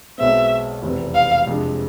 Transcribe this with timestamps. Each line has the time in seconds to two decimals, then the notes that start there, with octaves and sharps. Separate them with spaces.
0.18 B1 B2 G#3 C4 E5
0.83 F1 E2 C3
1.15 F5
1.47 F2 C3 G#3 D4